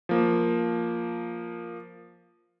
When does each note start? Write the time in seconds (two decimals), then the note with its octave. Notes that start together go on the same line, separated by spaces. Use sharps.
0.09 F3 A#3